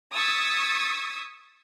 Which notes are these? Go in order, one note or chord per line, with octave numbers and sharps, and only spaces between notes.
C#6 D#6 E6 G#6 A6 B6